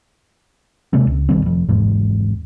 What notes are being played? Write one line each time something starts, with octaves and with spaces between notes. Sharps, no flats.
C3 G#3 A#3 C4
C#2
B1 D#3 G3 C4
F1 F2
G#1 E2 G#2